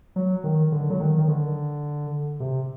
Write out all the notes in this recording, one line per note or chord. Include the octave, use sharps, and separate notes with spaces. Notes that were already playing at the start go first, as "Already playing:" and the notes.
F#3
D#3
D3
F#3
D#3
D#3
D3
C3